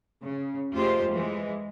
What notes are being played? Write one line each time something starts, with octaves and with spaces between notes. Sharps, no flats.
C#3
F2 G#3 A3 F4 G4 C5
E3 G#3